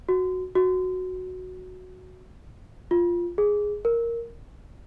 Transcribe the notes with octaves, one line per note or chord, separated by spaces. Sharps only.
F#4
F#4
F4
G#4
A#4